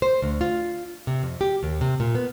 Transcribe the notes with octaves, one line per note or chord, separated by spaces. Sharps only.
C5
D2
F4
C3
F2
G4
D#2
C3
A#2
B3